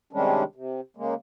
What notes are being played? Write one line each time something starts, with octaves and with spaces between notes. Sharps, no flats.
C3 D#3 G3 G#3 C#4 D4
C3
C#3 G#3 A#3